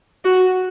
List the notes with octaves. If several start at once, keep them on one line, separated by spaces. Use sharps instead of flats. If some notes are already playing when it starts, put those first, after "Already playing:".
F#4